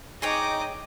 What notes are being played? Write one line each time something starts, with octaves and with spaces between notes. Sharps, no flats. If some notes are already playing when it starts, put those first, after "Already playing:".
D#4 G#4 C#5 D#5 G5 D6